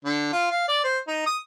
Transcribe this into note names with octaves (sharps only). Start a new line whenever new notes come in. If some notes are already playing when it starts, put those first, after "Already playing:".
D3
F4
F5
D5
C5
D#4
D#6